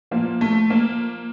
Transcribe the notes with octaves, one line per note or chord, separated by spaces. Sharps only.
A#2 F3 A#3
A3
A#3